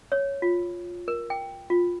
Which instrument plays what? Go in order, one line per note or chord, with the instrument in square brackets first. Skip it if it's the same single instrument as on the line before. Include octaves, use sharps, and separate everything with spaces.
[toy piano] C#5
F4
A#4
G5
F4